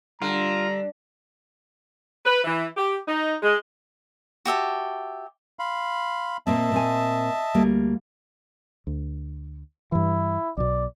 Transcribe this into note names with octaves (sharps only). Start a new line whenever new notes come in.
D3 G3 F4 A#5
B4
E3
G4
D#4
G#3
F#4 G4 E5 A5
F5 B5 C6
A#2 A#3 C4 D#5 E5 A5
A#2 C4 G#5
D2 G3 A#3
D2
G2 E3 E4
B1 B2 D5